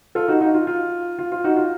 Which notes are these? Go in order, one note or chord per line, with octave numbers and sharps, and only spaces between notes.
F4 A4
D#4 F#4
D#4 F#4
F4
F4
F4
F4
D#4 F#4
F4